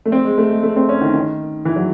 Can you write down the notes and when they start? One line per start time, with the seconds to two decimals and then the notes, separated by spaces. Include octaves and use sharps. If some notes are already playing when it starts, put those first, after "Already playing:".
0.05 A3
0.12 C4
0.25 G#3
0.38 A3
0.50 G#3
0.63 A3
0.76 C4
0.89 C#4
1.01 D#3
1.14 D#3
1.65 E3
1.76 F#3